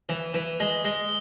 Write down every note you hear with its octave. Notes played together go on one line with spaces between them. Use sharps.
E3
E3
G#3
G#3